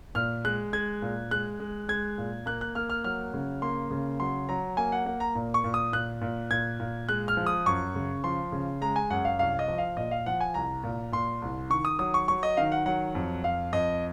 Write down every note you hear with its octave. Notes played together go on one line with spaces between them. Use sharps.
A#2 F6
G#3 F#6
G#3 G#6
A#2
G#3 F#6
G#3
G#3 G#6
A#2
A#3 F#6
F#6
A#3 F6
F6
F#3 F6
C#3
A#3 C6
C#3
F#3 C6
F#3 A#5
A#3 G#5
F#5
A#3 F#5
A#5
A#2
C#6
A#2
D#6
A#2 F#6
A#2
A#2 G#6
A#2
G#3 F#6
F6
F3
D#6
F#2 C#6
C#3
F3 C6
C#3
G#3 A#5
G#5
F#2 F#5
F5
C2 F5
D#5
F3
F5
A#2 D#5
F5
F3 F#5
G#5
C2 A#5
A#2
A#2 C6
C2
D#3 C#6
D#6
F#3 D#6
C#6
F#3 C#6
D#5
D#3 F5
F#5
F#3 F#5
F2
F2 F5
F2 D#5